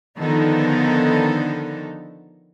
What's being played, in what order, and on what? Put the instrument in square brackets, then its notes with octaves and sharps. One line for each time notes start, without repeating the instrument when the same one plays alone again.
[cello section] D3 D#3 F3 B3 D#4 A4